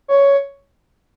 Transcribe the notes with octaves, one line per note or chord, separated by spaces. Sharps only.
C#5